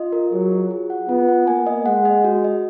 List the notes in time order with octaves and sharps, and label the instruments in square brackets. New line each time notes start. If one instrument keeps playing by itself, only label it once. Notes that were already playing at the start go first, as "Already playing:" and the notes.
Already playing: [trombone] F4 [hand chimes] D#5
[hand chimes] A#4
[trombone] F#3 [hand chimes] G#4
[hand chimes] F4
G#4
F#5
[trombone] B3 [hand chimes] F4
[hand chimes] F#5
[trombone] A#3 [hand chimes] G#5
[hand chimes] D#5
[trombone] G#3 [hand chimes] F#5
[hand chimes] D#5
F#4
D#5